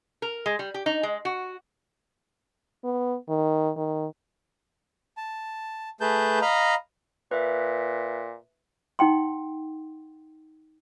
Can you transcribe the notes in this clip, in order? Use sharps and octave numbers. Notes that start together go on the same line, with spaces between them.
A#4
G#3
G3
G4
D#4
G#3
F#4
B3
D#3
D#3
A5
A3 G#4 B4 A5 G6
D#5 F5 A#5 B5
A#2 B4 E5
D#4 F#5 G5 C6